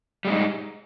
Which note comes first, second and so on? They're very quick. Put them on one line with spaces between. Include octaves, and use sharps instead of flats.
G3 G#3 D#4